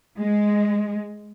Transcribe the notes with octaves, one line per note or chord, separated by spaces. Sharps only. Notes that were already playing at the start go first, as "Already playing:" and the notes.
G#3